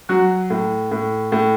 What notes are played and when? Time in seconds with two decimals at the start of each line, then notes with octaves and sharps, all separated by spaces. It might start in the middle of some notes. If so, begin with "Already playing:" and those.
0.09 F#3 F#4
0.50 A2
0.91 A2
1.32 A2